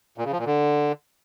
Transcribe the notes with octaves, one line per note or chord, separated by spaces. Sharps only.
A#2
C#3
F3
A#2
D3